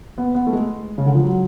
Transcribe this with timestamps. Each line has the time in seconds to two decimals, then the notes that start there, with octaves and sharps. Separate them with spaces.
0.18 B3
0.35 B3
0.47 A3
0.53 G#3
0.98 C#3
1.06 D3
1.15 F3
1.23 F#3